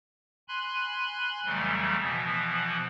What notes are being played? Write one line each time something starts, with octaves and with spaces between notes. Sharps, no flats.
G#5 B5 C6 F#6
F2 C#3 E3 F#3 G3 A3
B2 E3 F3 B3